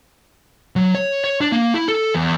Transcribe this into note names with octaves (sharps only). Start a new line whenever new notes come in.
F#3
C#5
C#5
D4
A#3
E4
A4
E2